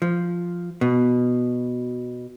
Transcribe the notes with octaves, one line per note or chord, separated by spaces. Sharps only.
F3
B2